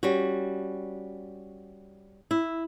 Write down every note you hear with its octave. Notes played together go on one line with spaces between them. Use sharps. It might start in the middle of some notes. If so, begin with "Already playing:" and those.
G3 C#4 F#4
E4